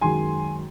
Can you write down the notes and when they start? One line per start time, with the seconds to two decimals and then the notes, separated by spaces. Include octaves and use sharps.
0.01 F#2 D#3 G#3 G#5 C6